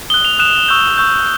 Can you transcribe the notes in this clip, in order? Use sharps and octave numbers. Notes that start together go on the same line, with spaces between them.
D#6 F#6 G7
F7
D#6 F#6 E7
C#6 E6 G6
C#6 E6 G6